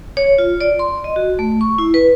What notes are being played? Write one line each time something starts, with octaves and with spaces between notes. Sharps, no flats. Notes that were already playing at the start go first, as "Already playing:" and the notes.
C#5
F4
D5
C6
D#5
F#4
A3
C#6
E4
B4